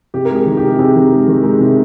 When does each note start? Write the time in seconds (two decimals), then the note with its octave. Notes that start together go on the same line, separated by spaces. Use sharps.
0.14 C3 G4
0.25 A#4
0.30 G#3 G#4
0.46 D#3
0.57 G4
0.63 C3
0.79 C3 G#4
0.95 D#3
1.11 G#3
1.27 D#3
1.44 G#3
1.60 C3